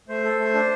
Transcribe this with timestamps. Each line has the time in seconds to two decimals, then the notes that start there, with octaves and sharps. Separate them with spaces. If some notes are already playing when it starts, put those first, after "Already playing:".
0.08 A3 C5
0.24 A4
0.39 A3
0.54 D4